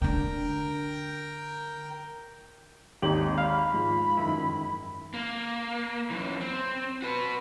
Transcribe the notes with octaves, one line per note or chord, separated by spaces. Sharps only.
D3 D4 A#4 G5
G#1 D#2 D#4 G4 F#7
F5 B5
G#2 F3
F#2 D#3 E4
A#3
F#2 E3
C4
F#4 B4